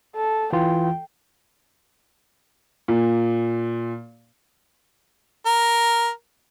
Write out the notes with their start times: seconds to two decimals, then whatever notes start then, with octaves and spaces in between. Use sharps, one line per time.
0.16 A4
0.53 E3 F4 G5
2.88 A#2
5.46 A#4